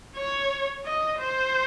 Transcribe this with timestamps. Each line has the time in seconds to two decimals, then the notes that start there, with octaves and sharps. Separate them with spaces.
0.16 C#5
0.86 D#5
1.19 C5